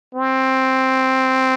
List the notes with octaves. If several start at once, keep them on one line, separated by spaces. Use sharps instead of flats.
C4